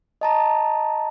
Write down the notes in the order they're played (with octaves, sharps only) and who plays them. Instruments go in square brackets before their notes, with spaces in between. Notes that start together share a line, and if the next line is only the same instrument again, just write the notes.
[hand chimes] D#5 A5 A#5